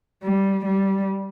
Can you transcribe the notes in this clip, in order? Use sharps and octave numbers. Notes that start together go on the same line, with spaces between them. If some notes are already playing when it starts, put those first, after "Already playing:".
G3
G3